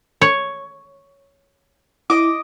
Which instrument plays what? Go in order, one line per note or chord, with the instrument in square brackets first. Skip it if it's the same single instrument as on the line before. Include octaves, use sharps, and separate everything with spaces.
[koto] C#5
[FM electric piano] E4 [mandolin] D#5 D6